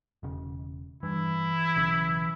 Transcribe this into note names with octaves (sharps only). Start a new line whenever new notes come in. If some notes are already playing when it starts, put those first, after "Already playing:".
E1 C#3
G2 E3 E4
B1 C#3